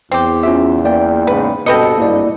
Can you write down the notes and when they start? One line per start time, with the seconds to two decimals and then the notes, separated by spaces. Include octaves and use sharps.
0.12 E2 C4 G4
0.43 C#4 F4 E5
0.85 A#3 D5 G5
1.27 E2 G#2 C#3 B4
1.66 G2 B2 C4 A4 B4 D#5 C#7
1.98 G#1 G2 A#3 E4 D5